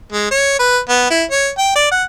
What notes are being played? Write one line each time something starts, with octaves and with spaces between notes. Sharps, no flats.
G#3
C#5
B4
B3
E4
C#5
G5
D5
F#5